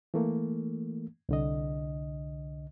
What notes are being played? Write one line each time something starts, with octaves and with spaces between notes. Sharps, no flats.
E3 A3 A#3
C2 D3 D#5